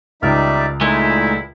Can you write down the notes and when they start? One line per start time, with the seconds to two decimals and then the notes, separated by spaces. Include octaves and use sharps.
0.22 C#2 D#3 G3 D#4 D5 E5 F6
0.81 A#2 G#3 A3 D#4 E4